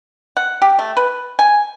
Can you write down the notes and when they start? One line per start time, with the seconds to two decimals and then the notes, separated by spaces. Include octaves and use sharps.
0.37 F#5
0.62 G4
0.79 A3
0.97 B4
1.39 G#5